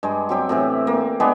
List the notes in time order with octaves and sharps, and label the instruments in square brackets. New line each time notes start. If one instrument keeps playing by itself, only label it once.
[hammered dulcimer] G2 G#3
F#3 C4 G4
A2 C3 E3
A#3
G#3 B3 D4 G4